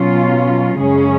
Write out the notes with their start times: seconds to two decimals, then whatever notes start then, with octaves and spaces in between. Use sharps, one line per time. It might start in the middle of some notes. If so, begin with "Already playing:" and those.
Already playing: B2 F#3 C#4 F4
0.78 F#2 C#3 G#3 C#4 G#4